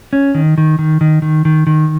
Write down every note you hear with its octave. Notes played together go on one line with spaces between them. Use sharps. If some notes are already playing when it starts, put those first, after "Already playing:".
C#4
D#3
D#3
D#3
D#3
D#3
D#3
D#3